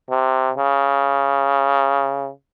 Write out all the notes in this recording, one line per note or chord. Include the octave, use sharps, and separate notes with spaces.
C3
C#3